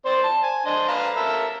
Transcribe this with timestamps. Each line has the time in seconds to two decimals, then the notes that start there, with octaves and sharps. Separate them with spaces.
0.05 C4 C5 D5
0.24 A5
0.43 G#5
0.66 D4 C5 D#5
0.89 B4 F5 A#5
1.16 A4 A#4 E5